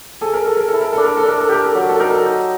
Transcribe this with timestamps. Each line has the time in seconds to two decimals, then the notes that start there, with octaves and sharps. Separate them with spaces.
0.21 G#4 A4
0.34 A#4
0.45 G#4 A4
0.57 A#4
0.68 E4 A4
0.81 A#4
0.93 D4 A4
1.05 A#4
1.17 A4
1.23 D4
1.28 A#4
1.41 A4
1.49 G4 A#4
1.64 A4
1.75 F#3 A#4
1.89 A4
2.00 D#4 A#4
2.12 A4
2.26 D#4